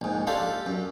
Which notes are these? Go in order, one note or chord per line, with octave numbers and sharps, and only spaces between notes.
A#1 G#2
D4 F4 G4 A4 F5
F#2